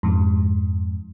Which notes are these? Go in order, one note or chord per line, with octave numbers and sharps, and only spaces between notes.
F2 G#2